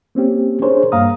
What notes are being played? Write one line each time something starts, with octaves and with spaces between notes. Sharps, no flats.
A#3 C4 C#4 G4
D4 G#4 A#4 C5 C#5
G2 A#3 F5 A#5 D#6